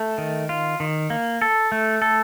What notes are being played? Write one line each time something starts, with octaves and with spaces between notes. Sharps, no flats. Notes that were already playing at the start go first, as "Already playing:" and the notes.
Already playing: A3
D#3
F4
D#3
A#3
A4
A3
A4